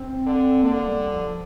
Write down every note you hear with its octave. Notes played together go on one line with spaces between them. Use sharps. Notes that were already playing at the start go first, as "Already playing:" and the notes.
Already playing: C4
D3
D3 A#3
G3
F3